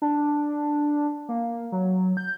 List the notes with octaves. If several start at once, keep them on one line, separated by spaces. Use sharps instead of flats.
D4
A#3
F#3
G6